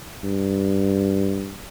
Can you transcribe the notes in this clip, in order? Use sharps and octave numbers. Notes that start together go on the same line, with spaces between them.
G2